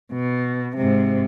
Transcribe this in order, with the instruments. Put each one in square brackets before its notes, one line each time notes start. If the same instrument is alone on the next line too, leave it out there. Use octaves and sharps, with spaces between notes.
[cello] B2
G#2 C3